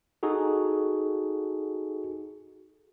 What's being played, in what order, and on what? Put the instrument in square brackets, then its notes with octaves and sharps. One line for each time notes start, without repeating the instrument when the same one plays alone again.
[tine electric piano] D#4 F#4 G#4 A4